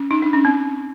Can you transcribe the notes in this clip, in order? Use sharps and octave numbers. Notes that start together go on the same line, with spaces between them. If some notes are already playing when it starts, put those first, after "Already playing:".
Already playing: C#4
D#4
D4
C#4
C4